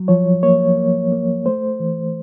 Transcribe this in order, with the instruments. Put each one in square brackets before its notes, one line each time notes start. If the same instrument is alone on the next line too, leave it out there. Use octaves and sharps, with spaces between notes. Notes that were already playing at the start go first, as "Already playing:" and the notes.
Already playing: [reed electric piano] F#3
F3 C#5
A#3 C#5
A#3
A#3
A3 C5
E3